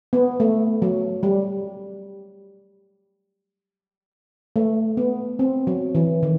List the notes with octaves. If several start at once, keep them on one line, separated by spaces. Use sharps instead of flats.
B3
A3
F#3
G3
A3
B3
C4
F#3
E3
D#3